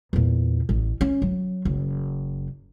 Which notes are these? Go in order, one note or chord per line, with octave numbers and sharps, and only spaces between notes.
E2 A#2
A1
C#4
F#3
F#1